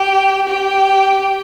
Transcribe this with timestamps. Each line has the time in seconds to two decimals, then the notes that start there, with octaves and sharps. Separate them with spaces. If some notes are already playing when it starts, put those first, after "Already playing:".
Already playing: G4
0.49 G4